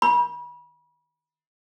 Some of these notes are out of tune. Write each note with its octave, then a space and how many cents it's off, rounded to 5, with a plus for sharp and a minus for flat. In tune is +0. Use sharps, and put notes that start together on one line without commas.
B5 -30